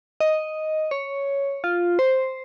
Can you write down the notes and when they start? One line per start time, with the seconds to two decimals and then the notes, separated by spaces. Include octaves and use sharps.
0.20 D#5
0.91 C#5
1.64 F4
1.99 C5